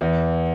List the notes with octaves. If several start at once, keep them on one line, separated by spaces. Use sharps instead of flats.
E2 E3